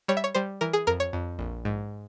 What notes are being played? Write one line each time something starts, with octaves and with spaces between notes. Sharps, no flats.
G3 C#5
E5
C#5
G3 C5
E3 A#4
G#4
F2 A#4
C#5
F2
A#1
G#2